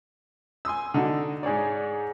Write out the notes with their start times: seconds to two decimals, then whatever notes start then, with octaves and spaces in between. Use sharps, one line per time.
0.65 G#5 C6 D#6 E6
0.94 D3 D#4 F#4
1.43 G#2 G#4 C#5 D5